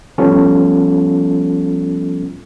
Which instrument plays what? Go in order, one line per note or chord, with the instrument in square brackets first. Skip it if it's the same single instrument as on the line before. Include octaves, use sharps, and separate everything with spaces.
[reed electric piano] F3 G3 B3 C#4 F4 A4